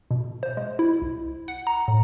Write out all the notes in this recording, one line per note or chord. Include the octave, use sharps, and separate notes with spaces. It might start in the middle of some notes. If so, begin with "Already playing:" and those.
B2
C5
G#3
E4
C2
F#5
A#5
A2